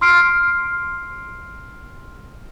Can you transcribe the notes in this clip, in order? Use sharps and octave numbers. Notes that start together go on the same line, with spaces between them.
C6 E6 F6 C7 D7